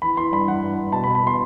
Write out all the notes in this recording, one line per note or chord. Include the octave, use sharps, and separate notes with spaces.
E3 B5
E3 C6
G2 B5
E3 F#5
G2
G2
B2 A5
B5
B2
B5
B2 C6